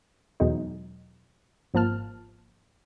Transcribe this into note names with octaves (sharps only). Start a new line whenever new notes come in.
E2 B2 F#3 G#3 D#4
G#1 F3 A#3 A5 F6